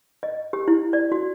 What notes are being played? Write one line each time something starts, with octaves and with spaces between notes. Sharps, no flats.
D#5
G4
E4
D5
F#4